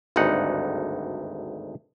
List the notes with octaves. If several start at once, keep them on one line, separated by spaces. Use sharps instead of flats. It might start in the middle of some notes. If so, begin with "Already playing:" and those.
G#1 D2 G2 D#4 F#5